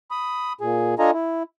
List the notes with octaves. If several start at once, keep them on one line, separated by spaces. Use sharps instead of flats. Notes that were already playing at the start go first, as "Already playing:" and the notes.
B5 D#6
A#2 G#4
D4 F4 A4 D#5 G#5 A#5
E4